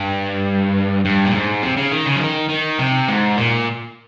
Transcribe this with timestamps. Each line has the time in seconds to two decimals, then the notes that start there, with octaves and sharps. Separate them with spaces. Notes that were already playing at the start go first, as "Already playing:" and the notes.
Already playing: G2
1.05 G2
1.25 A#2
1.34 G#2
1.62 C3
1.77 C#3
1.92 D#3
2.06 C#3
2.16 F3
2.21 D#3
2.50 D#3
2.79 C3
3.08 G#2
3.36 A#2